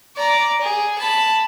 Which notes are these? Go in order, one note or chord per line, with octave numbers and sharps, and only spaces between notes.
D5 A#5
G#4
A5 B5